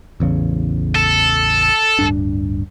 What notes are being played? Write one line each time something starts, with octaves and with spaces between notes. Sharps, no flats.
A1 E2 C#3
A4
D1 G2 D4